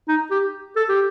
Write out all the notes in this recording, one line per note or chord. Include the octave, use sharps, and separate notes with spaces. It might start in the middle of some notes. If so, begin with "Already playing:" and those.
D#4
G4
A4
G4